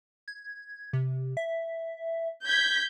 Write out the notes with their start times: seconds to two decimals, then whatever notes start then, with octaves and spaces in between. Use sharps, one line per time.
0.28 G#6
0.93 C3
1.37 E5
2.46 G6 G#6 B6